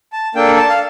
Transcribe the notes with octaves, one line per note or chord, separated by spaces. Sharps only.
A5
A#3 D4 A4 G5
A5
F5